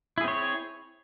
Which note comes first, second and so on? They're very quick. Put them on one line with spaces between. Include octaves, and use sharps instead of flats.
E4 G#4 C4 C#5